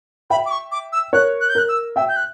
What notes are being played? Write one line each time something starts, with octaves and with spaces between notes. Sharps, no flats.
E5 G5 B5
D6
C#6
D6
E6
A#4 C#5 F#6
F#6
G6
A#4 F#6
E6
E5 G5 E6
G6
F#6